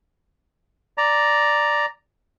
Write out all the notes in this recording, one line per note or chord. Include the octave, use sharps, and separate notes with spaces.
D5 A#5